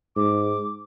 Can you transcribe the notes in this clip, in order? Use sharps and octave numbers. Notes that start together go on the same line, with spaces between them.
G#2 D6